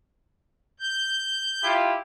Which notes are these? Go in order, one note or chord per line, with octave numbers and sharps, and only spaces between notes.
G6
E4 F4 G4